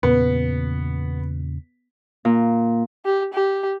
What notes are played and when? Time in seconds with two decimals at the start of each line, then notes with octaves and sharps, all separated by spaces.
0.03 E2 A#2 C#3 B3
2.25 A#2
3.05 G4
3.34 G4